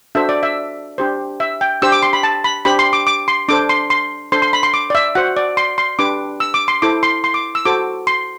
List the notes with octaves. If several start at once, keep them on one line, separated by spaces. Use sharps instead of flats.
D4 F#4 A4 C5 E5
D5
E5
D4 G4 C5
E5
G5
D4 G4 C5 E6
D6
C6
B5
A5
B5
D4 G4 C5 B5
C6
D6
D6
C6
D4 A4 C5 D6
C6
C6
D4 A4 C5 C6
C6
B5
C6
D6
D5
E5
F#4 C5 F#5
D5
C6
C6
D4 G4 B4 D6
E6
D6
C6
E4 A4 C5 D6
C6
C6
D6
E6
F#4 A4 C5 D6
C6